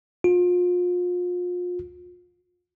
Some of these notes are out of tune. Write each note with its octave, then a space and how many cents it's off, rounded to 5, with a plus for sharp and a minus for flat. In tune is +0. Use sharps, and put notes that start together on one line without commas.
F4 +35